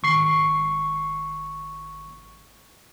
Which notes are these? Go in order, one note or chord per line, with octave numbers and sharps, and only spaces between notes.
G#1 C#6 C7